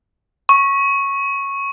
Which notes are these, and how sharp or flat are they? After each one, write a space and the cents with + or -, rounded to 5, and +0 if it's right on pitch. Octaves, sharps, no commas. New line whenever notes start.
C#6 -10